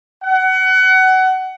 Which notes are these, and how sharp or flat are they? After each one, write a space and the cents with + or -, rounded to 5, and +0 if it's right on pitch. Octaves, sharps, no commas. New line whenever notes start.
F#5 +25